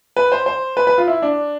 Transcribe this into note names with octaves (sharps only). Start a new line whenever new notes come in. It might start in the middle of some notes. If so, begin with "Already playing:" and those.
B4
C5
C5
B4
B4
F4
E4
D4